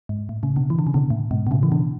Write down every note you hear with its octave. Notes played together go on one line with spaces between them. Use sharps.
G#2
A2
A2 C#3
B2 D3
E3
D3
C#3
B2 D3
A2
G#2 B2
B2
A2 C#3
E3
B2 D3